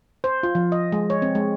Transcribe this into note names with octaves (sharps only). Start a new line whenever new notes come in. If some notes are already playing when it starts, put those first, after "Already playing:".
C5
F4
F3
D#5
G#3
C#5
C4
G#3